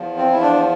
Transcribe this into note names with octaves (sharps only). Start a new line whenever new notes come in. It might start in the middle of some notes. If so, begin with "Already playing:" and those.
Already playing: E2 F3
C4
E2 E4
D4